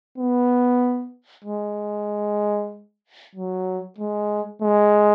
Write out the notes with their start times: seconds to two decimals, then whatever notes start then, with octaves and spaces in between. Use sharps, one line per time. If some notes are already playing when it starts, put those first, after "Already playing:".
0.18 B3
1.45 G#3
3.36 F#3
3.98 G#3
4.62 G#3